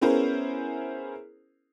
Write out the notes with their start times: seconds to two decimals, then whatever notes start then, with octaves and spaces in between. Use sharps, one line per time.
0.01 B3 C#4 E4 G#4 A#4 C5